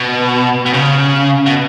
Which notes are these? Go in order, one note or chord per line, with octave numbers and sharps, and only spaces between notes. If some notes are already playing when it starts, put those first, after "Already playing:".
Already playing: B2
B2
C#3
B2